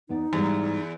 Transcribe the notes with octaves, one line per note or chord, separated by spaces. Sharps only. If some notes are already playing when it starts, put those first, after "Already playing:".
E2 B3 D#4 D5
E2 G#2 G3